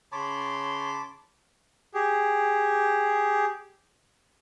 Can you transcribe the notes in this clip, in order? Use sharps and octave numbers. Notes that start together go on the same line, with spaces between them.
C#3 C#5 A5 B5 C6 D6
G4 G#4